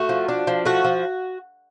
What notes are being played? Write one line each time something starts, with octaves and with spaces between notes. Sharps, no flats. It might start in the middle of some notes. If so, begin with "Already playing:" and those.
Already playing: A3 F#4
F3
D4
F3
A3 F#4
F3